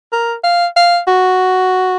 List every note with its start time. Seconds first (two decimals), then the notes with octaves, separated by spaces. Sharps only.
0.12 A#4
0.44 F5
0.76 F5
1.08 F#4